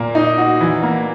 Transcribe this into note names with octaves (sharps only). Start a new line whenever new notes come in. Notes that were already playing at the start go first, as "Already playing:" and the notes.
Already playing: A#2 A#3
D#4
F#4
E3
A#3